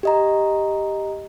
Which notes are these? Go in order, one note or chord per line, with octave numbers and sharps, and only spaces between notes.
G4 D#5 A#5